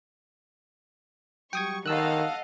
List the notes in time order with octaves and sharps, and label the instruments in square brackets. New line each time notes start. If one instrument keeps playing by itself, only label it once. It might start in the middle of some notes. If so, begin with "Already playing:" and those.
[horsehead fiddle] F#3 G3 [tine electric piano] G5 D#6 G#6 [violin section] C#6
[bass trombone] D#3 [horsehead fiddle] A4 F#5 [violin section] D#5 F5 [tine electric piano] A5 E6 F#6